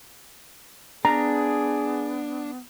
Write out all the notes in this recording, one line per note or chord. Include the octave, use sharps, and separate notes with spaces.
B3 D4 G#4 A#5